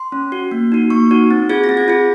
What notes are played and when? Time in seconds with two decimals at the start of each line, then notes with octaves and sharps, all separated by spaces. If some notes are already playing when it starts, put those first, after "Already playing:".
Already playing: C6
0.12 C#4
0.32 F#4
0.51 A#3
0.72 D#4 F#4
0.90 A#3 C#6
1.11 D#4 F#4
1.31 C4
1.49 F4 G#4 G#6
1.64 A#6
1.69 C4
1.77 G#6
1.88 F4 G#4